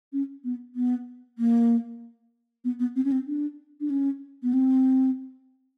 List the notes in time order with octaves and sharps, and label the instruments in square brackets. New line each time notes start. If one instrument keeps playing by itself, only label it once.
[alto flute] C#4
B3
B3
A#3
B3
B3
C4
C#4
C4
D4
D4
C#4
B3
C4